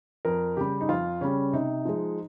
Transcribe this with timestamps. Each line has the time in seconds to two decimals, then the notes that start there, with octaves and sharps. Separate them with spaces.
0.25 F2 A#4
0.57 C#3 G3 G4
0.81 D#4
0.89 F2 F4
1.21 C#3 G3 C#4
1.53 C3 D#4
1.85 F3 G#3